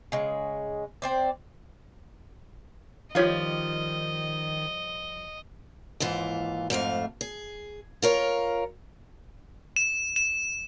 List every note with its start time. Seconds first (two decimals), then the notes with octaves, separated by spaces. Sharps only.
0.12 C#3 G#3
1.02 C4 C5 D5
3.15 D#3 F3 G3 F4 C#5 D#5 F5
6.00 D#2 G#2 E3 F4
6.70 F2 G#2 A3 F5
7.21 G#4
8.02 F4 A#4 C#5
9.76 E7
10.16 E7